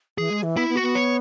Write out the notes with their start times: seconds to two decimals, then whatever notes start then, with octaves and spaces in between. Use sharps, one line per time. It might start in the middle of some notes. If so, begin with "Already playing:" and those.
0.18 E3 G#4
0.30 G#3
0.43 E3
0.57 B3 E4
0.69 B3
0.76 F#4
0.82 B3
0.95 C#5